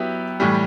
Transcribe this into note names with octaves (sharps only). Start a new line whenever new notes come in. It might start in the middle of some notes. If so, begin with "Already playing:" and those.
Already playing: F#3 B3 E4 G4
A2 E3 G3